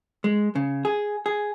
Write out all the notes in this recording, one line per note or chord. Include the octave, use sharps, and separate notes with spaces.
G#3
C#3
G#4
G#4